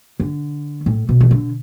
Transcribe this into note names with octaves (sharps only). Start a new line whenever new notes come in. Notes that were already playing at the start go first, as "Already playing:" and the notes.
D3
A2
B2
E3
D3